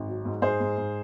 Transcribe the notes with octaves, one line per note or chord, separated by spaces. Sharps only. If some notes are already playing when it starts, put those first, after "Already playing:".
Already playing: G#1
F#3
G#2
G#2 G#4 C5
G#2
G#2